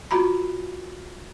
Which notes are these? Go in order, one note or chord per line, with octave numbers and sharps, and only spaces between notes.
F4 F#4 A#5 B5